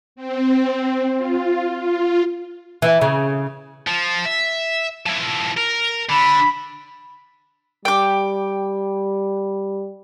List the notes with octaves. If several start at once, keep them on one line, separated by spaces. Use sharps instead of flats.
C4
F4
F4
E3
C#3
F3
E5
F3 E4
A#4
D3 B5
G3 G5 D6